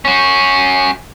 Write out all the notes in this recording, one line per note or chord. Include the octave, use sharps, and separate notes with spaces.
C#4 F#4